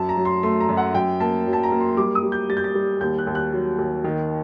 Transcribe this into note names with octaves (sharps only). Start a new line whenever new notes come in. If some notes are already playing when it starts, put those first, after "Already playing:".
Already playing: F#2 A5
A#5
F#3
C6
A3 C6
A#5
F#2
F#5
F#2 G5
A#3 A5
F#3
A5
A#5
A#3
C6
G3 D6
D#6
G3
G6
G3 A6
G6
A6
G3
D#2 G6
F#6
D#2
F#6
F#3
D#2
D#3